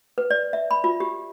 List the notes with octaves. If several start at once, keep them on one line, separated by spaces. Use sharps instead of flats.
B4
D5
E5
B5
F4
G4